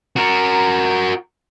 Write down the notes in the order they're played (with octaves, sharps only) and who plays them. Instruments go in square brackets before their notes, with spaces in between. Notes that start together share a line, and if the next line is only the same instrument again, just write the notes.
[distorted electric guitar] F#4 A#4 [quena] A#5